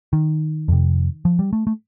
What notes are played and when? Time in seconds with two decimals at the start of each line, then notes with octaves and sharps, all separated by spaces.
0.13 D#3
0.68 F2 C3
1.25 F3
1.39 G3
1.53 A3
1.67 A3